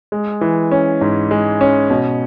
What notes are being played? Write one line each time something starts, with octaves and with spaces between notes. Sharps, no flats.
G#3
E3
C#4
G#2
G#3
C#4
B2